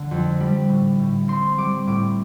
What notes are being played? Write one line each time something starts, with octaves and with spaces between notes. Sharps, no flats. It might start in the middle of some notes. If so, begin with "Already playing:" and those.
Already playing: D3
F2
G3
A2
A2
C4 C6
G3 D6
A2 D6